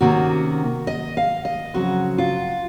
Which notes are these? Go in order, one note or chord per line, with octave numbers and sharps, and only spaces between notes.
C3 D#3 A#3 C#4 F#4
D#5
F5
D#5
F2 C#3 F#3 C4 F#4
F4